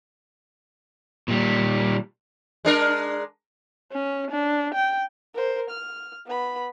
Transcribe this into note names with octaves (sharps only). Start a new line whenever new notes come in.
A#2 G3
G#3 D4 A#4
C#4
D4
G5
A#4 C5
F6
B3 B5